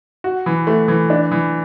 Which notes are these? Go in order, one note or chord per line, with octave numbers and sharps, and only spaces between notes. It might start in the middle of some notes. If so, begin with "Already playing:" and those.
F#4
E3
A3
E3
D4
E3